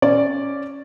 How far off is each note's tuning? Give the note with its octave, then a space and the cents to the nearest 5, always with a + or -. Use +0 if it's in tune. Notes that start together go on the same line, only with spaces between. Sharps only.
C#4 +0 D5 -5